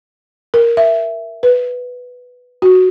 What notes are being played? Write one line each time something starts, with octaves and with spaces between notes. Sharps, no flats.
A#4
E5
B4
F#4